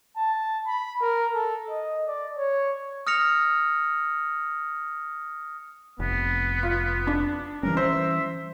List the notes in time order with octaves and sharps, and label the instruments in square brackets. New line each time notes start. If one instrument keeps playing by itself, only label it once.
[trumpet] A5
B5
A#4
A4
D#5
D5
C#5
[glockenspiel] D#6 F6 A#6 C#7 F7
[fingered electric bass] F1 [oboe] B3
[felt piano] F4
D4
[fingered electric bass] E3 G3 C#4 [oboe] A#4
[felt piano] C5 [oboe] E5